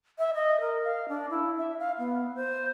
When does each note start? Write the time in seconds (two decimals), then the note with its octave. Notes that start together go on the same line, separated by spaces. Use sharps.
0.18 E5
0.35 D#5
0.60 A#4
0.84 F5
1.09 D4
1.30 E4
1.57 E5
1.79 F5
1.99 B3
2.35 C5